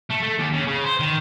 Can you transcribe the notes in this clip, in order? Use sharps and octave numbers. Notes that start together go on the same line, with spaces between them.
A3
A3
D#2
C#3
C#3
C5
D#3